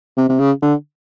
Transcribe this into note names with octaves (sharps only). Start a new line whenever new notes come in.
C3
C3
C#3
D3